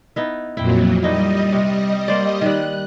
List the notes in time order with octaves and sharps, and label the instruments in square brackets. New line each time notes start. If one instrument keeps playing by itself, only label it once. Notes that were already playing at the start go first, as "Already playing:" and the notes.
[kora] B3 D#4 E4
[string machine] F2 A#2 F#3 [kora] E4 G5
[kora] A#2 D#4 E4 [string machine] G3 D#5
[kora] C3
A#3 C5 D5
[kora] D#3 G3 [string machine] F#6